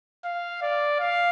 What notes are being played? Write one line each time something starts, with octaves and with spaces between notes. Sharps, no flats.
F5
D5
F5